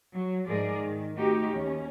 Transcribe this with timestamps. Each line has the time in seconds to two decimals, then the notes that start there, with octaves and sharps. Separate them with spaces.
0.13 F#3
0.47 G#2 F3 G#4 A#4 D5
0.77 D#3
1.16 A3 C4 D#4 F#4 G4
1.49 D#2 C#4